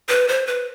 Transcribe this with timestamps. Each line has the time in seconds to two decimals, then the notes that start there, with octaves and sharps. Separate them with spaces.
0.09 B4
0.28 C5
0.47 B4